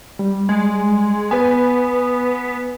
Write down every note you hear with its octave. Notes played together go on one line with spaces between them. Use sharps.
G3
G#3
B3 B4 G#5